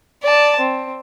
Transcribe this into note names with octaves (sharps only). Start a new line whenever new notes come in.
D5 A5
C4